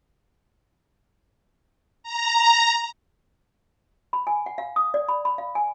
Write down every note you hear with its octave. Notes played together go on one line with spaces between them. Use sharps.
A#5
B5
G#5
F#5
F5
D#6
D5
B5
B5
F5
G#5